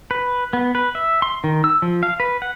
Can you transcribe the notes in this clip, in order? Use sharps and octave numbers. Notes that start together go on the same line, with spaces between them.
B4
B3
B4
E5
C6
D#3
E6
F3
F5
B4
F#5